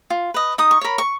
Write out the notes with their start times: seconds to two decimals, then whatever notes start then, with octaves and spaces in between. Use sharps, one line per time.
0.10 F4
0.34 B4 D#5
0.58 D#4 D#6
0.71 C#6
0.81 A#4 C#5 B5
0.98 C#6